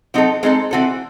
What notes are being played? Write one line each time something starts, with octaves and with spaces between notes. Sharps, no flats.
F#3 C4 D#4 A4
G#3 C4 D#4 A4
E3 C4 F#4 A4